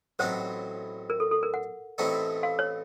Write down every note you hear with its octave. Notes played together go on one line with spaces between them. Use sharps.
A1 A2 F#3 C4 D#4 C5
A#4
A4
A4
A#4
F#5
A1 A2 A3 C4 D#4
F5
C#5